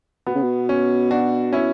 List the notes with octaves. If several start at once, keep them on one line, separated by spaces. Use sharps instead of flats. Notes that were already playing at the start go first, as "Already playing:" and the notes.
B2 B3
C#3
B2
C#4
D4 F#4
C#4 E4